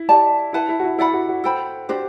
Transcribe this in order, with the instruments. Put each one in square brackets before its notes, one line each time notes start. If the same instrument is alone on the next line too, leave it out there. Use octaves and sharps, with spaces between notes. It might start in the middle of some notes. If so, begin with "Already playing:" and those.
Already playing: [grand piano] E4
[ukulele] G4 D5 A5
[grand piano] E4 [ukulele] B4 F#5 A5
[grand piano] E4
F#4
E4
[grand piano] E4 [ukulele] A4 D5 F#5 B5
[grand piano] F#4
F#4
[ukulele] A4 C5 G5 B5
[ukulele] D4 F#4 C5 [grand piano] G4